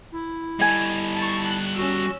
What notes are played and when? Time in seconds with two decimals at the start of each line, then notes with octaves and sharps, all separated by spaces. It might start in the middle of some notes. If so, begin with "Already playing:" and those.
0.12 E4
0.59 G3 A4 D#5 G#5
1.16 A5 C#6
1.47 F#6
1.76 C#4 F#4 E6